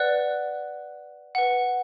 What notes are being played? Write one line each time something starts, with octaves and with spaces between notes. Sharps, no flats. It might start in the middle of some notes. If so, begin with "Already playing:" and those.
Already playing: B4 D5 F#5 F#6
B4 F#5